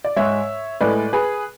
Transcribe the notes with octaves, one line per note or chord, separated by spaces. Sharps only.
D5
G#2 G#3 C#5 E5
A2 G#3 B4 D5
G#4 B4